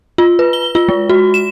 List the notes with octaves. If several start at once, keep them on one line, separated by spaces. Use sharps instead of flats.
F4
B4
G7
F4
G#3
F#4
E7